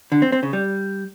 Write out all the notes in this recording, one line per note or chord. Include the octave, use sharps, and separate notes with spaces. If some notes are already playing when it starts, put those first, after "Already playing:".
D3
C4
C4
C#3
G3